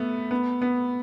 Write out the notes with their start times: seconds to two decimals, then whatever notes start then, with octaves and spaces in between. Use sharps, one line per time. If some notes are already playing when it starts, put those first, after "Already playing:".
Already playing: A3 B3
0.31 B3
0.62 B3